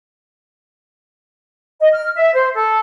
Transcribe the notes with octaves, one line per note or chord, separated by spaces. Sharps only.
D#5
F6
E5
C5
A4